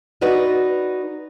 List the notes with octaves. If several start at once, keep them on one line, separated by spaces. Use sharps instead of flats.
D#4 F#4 B4 D5 D#5